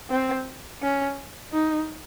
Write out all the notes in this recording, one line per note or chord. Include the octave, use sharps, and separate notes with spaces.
C4
C#4
D#4